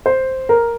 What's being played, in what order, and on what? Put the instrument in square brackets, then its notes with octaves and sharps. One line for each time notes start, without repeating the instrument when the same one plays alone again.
[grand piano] C5
A#4